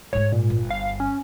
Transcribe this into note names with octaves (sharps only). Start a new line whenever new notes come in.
G#2 G#3 C#5
A#2
G1
F5
C#4